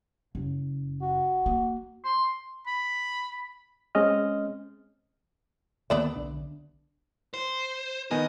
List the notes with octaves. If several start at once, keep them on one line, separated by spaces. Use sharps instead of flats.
F#1
F#4
A#3
C6
B5
G#3 C4 C#4 D#5 F6
D2 D#3 A#3 B3 D5 E5
B1 D3 D4
C5
D#3 B3 D#5 G#5